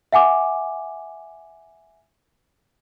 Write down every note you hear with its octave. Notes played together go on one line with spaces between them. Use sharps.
E5 F#5 G#5 D6